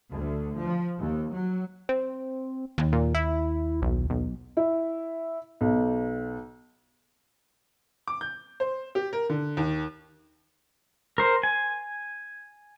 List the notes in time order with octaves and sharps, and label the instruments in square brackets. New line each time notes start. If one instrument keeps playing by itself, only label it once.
[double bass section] D2
F3
D#2
F#3
[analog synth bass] C4
[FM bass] D#2
[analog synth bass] A#2
E4
B1
B1
[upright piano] E4
B1
[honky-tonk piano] D6
G6
C5
G4
A#4
D3
D#2
[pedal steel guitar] A#4 C5
G#5